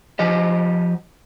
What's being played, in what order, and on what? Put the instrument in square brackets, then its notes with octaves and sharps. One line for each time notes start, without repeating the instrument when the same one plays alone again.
[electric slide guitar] F3 G4 D#5